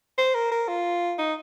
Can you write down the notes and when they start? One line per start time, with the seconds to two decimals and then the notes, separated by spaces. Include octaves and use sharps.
0.18 C5
0.35 A#4
0.52 A#4
0.68 F4
1.18 D#4